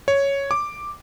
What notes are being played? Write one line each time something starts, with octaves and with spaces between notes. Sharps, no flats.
C#5
D6